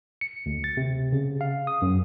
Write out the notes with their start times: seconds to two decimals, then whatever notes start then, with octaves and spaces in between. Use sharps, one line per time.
0.21 C#7
0.46 D2
0.64 A6
0.77 C3
1.12 C#3
1.41 F5
1.67 D#6
1.82 F#2